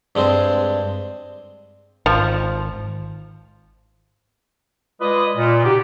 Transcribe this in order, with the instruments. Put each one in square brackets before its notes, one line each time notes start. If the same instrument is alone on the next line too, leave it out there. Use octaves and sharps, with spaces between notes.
[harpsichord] G2 G#3 C4 C5
[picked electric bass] G#1 [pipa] F3
[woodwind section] G#3 F4 B4 D5 D#5
A#2
C#3 D#4 F#4 G4